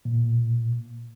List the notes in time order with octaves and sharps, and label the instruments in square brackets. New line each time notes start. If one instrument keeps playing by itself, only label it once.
[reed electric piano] A#2